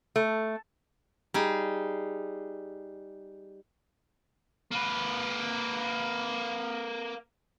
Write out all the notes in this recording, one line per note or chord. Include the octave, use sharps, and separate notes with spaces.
A3
G3 D#4 G#4
A#3 B4